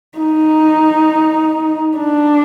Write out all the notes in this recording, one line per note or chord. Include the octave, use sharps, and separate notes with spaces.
D#4
D4